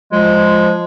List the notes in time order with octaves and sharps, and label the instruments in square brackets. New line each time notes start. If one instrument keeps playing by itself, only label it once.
[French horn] F3 [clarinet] G#3